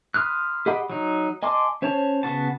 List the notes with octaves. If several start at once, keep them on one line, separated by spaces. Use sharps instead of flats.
B5 C6 D#6 F6 F#6
G4 G#4 D#5 F#5 B5
F#3 D#4
D#5 G#5 A5 C6 D6
C#4 C5 C#5 A5
C#3 B3 F#4 A5